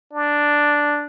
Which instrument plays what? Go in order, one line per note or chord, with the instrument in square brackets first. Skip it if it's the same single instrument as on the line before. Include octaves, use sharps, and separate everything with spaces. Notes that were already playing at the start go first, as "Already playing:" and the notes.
[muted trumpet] D4